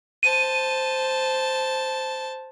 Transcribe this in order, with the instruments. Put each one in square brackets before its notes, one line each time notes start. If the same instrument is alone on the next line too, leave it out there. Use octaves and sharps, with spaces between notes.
[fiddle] C5 A5 [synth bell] D#7